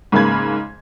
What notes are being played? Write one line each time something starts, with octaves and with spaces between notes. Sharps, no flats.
G#2 C#3 A#3 B5 G#6